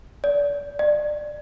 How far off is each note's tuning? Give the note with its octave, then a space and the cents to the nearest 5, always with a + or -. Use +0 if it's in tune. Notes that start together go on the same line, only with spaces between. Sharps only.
D5 -30
D5 +20